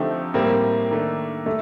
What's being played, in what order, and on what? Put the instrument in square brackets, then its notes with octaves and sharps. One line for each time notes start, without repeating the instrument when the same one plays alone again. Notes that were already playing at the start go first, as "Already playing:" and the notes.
Already playing: [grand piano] D3 F3 C4 D#4 G4 [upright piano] A3
[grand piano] A2 G3 C4 G4 [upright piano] A#3
[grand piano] D#3 A3 D4
[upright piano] A3 [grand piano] G4